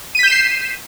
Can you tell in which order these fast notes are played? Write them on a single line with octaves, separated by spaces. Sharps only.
D#7 B6 G6 E7 C7